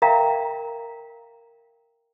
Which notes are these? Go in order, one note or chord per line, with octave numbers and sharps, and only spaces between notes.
A#4 E5 F5 G5 A#5